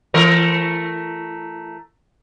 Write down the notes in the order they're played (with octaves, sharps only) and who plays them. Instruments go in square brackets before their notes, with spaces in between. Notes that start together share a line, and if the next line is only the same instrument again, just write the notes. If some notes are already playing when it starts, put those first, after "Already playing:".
[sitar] E3 A3 A#4